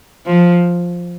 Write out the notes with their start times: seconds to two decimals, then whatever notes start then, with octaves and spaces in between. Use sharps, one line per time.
0.26 F3